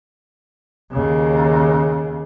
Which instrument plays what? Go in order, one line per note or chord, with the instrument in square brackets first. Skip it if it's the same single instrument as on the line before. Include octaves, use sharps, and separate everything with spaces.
[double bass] D#2 C#3